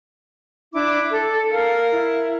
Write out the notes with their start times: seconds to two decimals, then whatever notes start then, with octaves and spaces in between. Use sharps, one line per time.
0.73 D4 E4 D6
1.11 A4
1.51 A#4 F5
1.92 E4